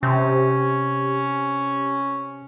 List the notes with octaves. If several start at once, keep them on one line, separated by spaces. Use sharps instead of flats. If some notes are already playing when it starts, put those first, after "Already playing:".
C3 C#4